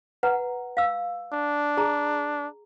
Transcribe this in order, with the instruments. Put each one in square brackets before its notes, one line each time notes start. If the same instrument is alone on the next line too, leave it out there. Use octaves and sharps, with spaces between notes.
[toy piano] B4 F#5 A#5
F5 E6
[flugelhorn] D4
[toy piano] G#4 A#5